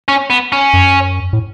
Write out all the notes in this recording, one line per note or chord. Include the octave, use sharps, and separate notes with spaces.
C#4
B3
C#4
F#2
A2